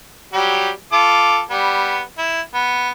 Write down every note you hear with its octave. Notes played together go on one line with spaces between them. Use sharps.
F#3 G3 G4
F4 A4 D6
G3 B3
E4
B3